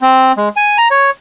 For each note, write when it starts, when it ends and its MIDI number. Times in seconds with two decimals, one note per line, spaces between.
0.01 0.32 60
0.37 0.49 56
0.56 0.78 80
0.78 0.88 82
0.91 1.10 73